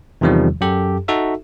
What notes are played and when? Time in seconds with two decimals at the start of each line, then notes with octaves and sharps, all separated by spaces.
0.21 E2 C3 D#3 F3 G3
0.61 F#2 G4 A4
1.08 D#4 F#4 A4 E5